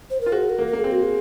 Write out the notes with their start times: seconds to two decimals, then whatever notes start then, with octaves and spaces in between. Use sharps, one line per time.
0.10 C5
0.21 A#4
0.26 F4
0.32 F#4 G#4
0.50 A#4
0.59 A#3
0.67 A#4
0.73 A#3
0.79 C4 G#4
0.92 F#4
1.03 G#4